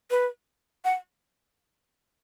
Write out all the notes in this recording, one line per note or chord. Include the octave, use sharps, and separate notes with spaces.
B4
F#5